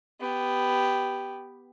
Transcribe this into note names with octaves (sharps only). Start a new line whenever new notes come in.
B3 G4